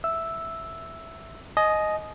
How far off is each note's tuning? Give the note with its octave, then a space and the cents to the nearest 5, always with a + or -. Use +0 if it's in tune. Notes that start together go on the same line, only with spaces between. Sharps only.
E5 +0 E6 +0
D#5 +0 G#5 +35